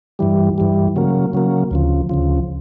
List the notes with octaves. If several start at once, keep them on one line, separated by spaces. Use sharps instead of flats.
G2 E3 G3
G2 E3 G3
C#3 F#3 A#3
C#3 F#3 A#3
D2 C#3 F3
D2 C#3 F3